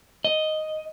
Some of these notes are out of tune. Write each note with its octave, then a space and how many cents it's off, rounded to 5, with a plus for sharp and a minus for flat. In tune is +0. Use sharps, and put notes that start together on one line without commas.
D#5 +0